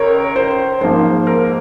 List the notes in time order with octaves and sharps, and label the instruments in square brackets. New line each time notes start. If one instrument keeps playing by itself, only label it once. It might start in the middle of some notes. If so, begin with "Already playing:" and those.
Already playing: [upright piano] C#2 A#4 C#5
C5
G#2 F3 A#3 C5
A#4